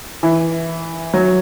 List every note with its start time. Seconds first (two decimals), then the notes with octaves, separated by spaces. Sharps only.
0.23 E3
1.14 F#3